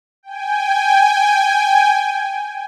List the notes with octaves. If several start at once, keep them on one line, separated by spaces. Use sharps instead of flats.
G5 G#5